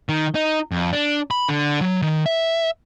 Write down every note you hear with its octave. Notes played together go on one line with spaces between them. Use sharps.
D#3
D#4
F2
D4
B5
D3
F#3
D#3
E5